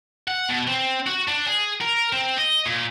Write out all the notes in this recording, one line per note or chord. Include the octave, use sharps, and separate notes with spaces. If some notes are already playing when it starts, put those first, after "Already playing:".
F#5
B2
C4
F#4
D4
G#4
A#4
C4
D#5
A#2